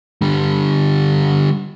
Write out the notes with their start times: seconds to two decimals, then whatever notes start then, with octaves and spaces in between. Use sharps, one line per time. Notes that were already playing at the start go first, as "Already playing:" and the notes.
0.22 D3 G3